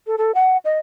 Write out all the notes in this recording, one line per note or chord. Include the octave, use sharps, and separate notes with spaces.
A4
A4
F#5
D#5